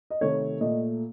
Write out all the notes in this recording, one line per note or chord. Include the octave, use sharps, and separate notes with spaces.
D#5
C3 D#3 A3 C#5
A#2 A3 D#5